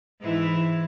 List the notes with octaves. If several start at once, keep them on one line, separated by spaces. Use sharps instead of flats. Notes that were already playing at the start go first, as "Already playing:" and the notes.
G#2 E3 E4